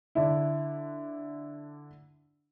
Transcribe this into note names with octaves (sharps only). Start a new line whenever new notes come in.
D3 D4 E4